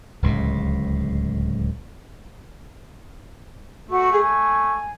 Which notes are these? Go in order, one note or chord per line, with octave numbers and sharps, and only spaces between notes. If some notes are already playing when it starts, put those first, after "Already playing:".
D1 C#2 A2
A3 F#4
G#4 A4
G#5